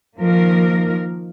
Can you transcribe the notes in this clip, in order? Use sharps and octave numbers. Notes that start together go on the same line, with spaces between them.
D#3 F3 A#3 A#4